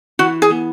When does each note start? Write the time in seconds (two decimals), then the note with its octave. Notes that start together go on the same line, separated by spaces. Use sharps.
0.19 E3 F#4
0.42 G#4
0.50 B3